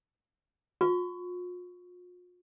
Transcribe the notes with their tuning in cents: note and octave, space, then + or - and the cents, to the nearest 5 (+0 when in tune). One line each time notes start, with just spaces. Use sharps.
F4 +40 C#6 +10